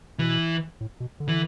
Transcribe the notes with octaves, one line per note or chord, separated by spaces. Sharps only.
B2 E3
A2
B2
D3
E3